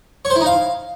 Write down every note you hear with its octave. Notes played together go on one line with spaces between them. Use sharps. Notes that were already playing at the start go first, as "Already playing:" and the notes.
C#5
C5
E4
D#4
F5